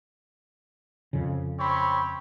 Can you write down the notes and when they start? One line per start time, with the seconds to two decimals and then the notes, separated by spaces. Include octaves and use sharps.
1.13 F2 C#3
1.58 C4 C#5 B5